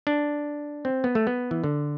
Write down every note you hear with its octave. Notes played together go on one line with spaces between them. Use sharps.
D4
C4
B3
A3
B3
E3
D3